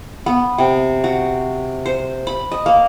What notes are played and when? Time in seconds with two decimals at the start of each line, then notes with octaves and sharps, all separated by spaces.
0.26 B3
0.58 C3
1.04 F#4
1.86 C5
2.27 B5
2.52 D#5
2.66 A#3